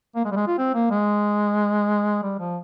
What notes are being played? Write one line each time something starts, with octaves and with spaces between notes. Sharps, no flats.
A#3
G#3
G3
G#3
F4
C4
A#3
G#3
G3
F3